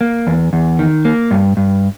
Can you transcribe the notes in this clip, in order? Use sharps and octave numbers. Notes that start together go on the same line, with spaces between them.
A#3
E2
E2
D#3
A#3
G2
G2